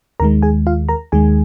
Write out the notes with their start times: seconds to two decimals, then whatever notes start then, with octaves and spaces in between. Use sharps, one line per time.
0.20 D#2 D#3 G#3 A#4 A#5
0.42 G#4 G#5
0.67 F4 F5
0.89 A#4 A#5
1.12 D#2 D#3 G#3 G#4 G#5